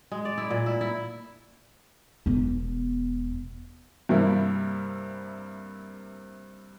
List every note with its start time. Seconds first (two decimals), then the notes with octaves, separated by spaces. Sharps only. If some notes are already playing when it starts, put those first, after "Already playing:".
0.11 G#3
0.25 D5
0.38 E4
0.50 A#2
0.66 E4
0.81 E4
2.26 E1 B3
4.09 G2 C3 G3 A#3 E4